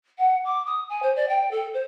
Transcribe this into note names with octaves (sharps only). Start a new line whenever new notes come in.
F#5
D6
D#6
G#5
C5
D5
G5
A4
C5